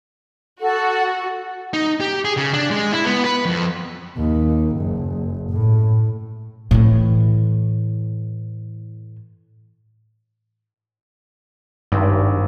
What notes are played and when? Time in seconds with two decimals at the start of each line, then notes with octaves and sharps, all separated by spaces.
0.62 F#4 A4 F#5
1.73 D#4
2.01 G4
2.25 G#4
2.37 C#3
2.54 D4
2.70 G#3
2.93 E4
3.05 B3
3.24 B4
3.46 F2
4.16 D#2
4.76 F#1
5.50 A2
6.71 A2 E3
11.92 G#1 G2